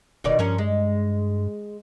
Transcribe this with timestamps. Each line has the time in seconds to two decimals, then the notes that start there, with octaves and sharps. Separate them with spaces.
0.24 D#1 B2 D#3 D5
0.39 G2 F3 C#4 A#4
0.58 G#3